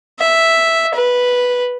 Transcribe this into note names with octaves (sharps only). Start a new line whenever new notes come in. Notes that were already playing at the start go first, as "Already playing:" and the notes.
E5
B4